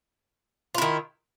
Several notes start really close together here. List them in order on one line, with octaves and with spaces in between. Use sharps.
F4 E4 D#3